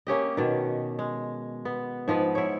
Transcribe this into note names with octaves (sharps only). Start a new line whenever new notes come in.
A#3 C#4 G4 D#5
B2 D#3
G#3
B3
G#2 F3 B3 B4
E4 C#5